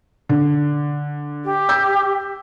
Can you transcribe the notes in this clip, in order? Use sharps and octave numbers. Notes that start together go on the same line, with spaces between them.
D3
G4
E6 G6